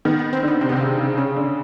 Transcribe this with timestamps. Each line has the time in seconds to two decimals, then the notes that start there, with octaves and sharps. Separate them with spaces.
0.05 D#3 B3
0.19 B3
0.33 C4
0.43 D3 B3
0.61 C3 C4
0.69 B3
0.72 C3
0.76 C#3 C4
0.99 C#3
1.17 C#3 C#4
1.36 D3